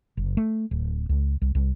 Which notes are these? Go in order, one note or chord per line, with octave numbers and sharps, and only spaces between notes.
F#1
A3
D1
C#2
C2
C2